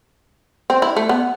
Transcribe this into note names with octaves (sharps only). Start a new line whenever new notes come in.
C4
E4
A3
B3